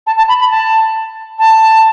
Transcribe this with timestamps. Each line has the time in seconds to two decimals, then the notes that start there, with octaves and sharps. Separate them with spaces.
0.07 A5
0.18 A5
0.29 B5
0.40 B5
0.51 A5
1.39 A5